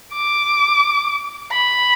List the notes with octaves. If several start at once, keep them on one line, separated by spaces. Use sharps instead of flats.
D6
B5